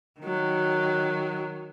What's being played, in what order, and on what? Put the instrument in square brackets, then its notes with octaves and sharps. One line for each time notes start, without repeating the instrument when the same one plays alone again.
[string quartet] D#3 F#3